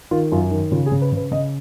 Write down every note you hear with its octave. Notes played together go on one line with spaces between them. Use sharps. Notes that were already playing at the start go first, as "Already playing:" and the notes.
D#3 F4
F#2 F4
D#3
C#3 F4
G#4
C#3
B4
C#3 B4
C#3 D#5